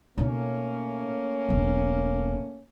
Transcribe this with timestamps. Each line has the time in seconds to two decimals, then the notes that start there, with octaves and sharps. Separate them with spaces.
0.18 B2 A3 A#3 C#4 D#4
1.49 E1 B1